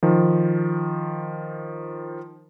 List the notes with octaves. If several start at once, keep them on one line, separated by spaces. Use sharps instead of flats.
D#3 F3